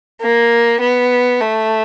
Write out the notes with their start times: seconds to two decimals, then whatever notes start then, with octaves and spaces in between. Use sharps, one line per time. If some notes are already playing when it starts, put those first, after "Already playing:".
0.21 A#3
0.80 B3
1.40 A3